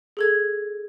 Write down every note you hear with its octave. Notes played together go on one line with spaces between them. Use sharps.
G#4 A4 G#6